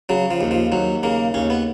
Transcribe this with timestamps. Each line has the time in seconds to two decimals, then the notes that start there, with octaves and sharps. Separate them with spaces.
0.09 C#3 F#3
0.31 F3
0.41 D#2
0.51 F3
0.72 D#2 F#3
1.03 C#3 A#3
1.34 D#2 C#4
1.50 B3